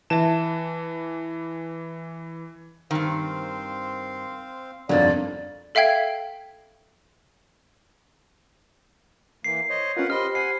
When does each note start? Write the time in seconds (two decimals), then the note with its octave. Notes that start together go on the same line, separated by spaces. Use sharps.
0.10 E3 E5 A5 E7
2.91 G2 D#3 C4 C5 F5
4.89 G1 F2 F#3 A#3 D#4 D5
5.75 A4 E5 F5 G5 G#6
9.44 E3 A#3 C7
9.70 C5 C#5 D#5
9.97 C#4 F4 A#4 B4 F#5
10.10 G4 C5 D#5 B5 C6 F6
10.35 F#5 G#5 C7